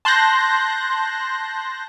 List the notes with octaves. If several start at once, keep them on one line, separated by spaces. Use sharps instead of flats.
A5 C6 F#6 G6 A#6